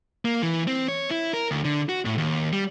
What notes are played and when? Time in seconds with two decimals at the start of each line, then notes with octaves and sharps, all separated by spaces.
0.25 A#3
0.43 E3
0.67 C4
0.88 C#5
1.10 E4
1.33 A#4
1.51 D2
1.65 D3
1.89 F#4
2.05 A2
2.18 D#2
2.53 G3